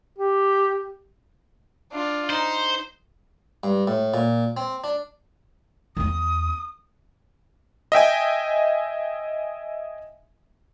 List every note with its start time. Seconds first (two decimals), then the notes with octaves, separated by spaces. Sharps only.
0.18 G4
1.92 D4 F4
2.30 D#4 C5
3.63 G2
3.87 A2
4.14 A#2
4.57 C4
4.84 D4
5.97 E2 B3 D#6
7.92 D#5 E5 G5 G#5